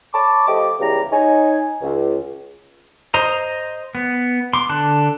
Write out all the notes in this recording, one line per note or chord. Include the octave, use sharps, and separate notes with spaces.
C#5 A5 B5 C#6 D6
F3 A3 G4 D#5 D6
C#2 C#3 E3 G3 B3 A#5
D#4 C#5 G#5
C#2
C5 D#5 A#5
B3
C6 D6
D3 A5 F#6